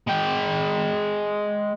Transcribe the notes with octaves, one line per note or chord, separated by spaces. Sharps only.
G#3 G5